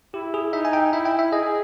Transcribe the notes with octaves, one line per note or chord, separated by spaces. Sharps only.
E4 G4
G#4
D#4 E5
G#5
G5
E4 E5
G5
E5
G#4 D#5